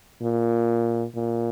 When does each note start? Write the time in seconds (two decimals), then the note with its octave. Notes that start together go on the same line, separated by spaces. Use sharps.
0.22 A#2
1.15 A#2